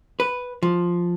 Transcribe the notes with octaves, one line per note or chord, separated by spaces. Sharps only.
B4
F3